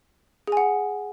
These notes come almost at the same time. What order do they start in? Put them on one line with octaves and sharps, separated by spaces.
G#4 G#5 F#5